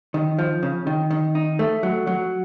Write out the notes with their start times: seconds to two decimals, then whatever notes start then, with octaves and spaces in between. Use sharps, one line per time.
0.14 D#3
0.39 F3
0.63 C#3
0.87 D#3
1.11 D#3
1.35 D#4
1.59 A3
1.83 F#3
2.07 F#3